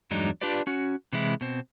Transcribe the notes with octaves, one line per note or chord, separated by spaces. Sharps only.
E2 G2 F#3 G#3 D4 D#4
D4 F4 G4 B4 D5
C#4 F#4
C3 E3 G#3 E4
B2 C4